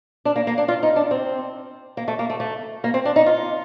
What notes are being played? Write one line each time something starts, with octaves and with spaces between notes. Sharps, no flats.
D4
A#3
A#3
D4
F4
D#4
D4
C4
A#3
A3
A#3
A3
A3
A#3
C4
D4
D#4
F4